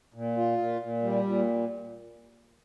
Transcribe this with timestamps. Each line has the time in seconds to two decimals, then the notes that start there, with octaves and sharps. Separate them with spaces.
0.14 A#2
0.37 F4
0.58 A#2
0.80 A#2
1.02 G3
1.24 A#2